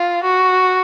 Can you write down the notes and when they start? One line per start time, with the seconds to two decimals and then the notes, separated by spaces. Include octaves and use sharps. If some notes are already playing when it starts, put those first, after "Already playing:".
Already playing: F4
0.23 F#4